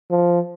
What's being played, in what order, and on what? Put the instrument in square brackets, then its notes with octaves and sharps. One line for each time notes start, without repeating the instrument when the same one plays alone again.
[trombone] F3